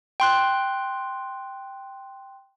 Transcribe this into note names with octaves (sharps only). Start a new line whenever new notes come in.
G5 C6 F#6